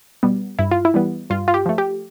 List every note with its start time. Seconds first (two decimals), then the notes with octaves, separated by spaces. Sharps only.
0.23 B2 G3 B3
0.59 G2 E4
0.71 F4
0.85 E4
0.94 E3 G3 B3
1.30 G2 F4
1.48 F4
1.54 G4
1.66 F3 A3
1.78 G4